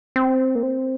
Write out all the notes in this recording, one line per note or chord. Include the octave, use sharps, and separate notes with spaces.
C4
A#3
C4